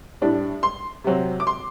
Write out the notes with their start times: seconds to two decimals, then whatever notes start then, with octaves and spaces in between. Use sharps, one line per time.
0.21 A2 G3 D4
0.63 C6
1.04 C3 F#3 C4
1.40 D6
1.47 C6